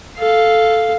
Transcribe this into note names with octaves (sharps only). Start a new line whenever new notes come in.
A4 F5